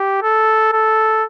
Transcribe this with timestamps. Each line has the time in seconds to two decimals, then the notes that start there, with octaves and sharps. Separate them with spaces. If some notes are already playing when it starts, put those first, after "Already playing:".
Already playing: G4
0.23 A4
0.72 A4